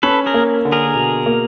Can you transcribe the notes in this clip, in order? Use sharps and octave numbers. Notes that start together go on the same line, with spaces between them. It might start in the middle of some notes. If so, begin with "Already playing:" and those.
C#4 A4 B4
G#4 A#4
A#3
D3
G#4 A#4
B2
A#3